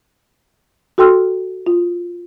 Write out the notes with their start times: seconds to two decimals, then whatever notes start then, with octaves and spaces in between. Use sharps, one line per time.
0.98 F#4 A4 G5 C6 E6 F6
1.67 F4